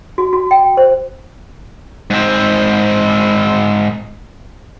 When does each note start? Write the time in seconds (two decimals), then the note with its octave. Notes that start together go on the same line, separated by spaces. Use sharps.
0.18 F#4
0.33 F#4
0.51 G5
0.77 C5
2.10 G#2 C4